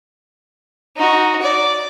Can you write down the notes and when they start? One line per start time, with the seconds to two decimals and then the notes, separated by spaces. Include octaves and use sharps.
0.97 D#4 F#4
1.41 D5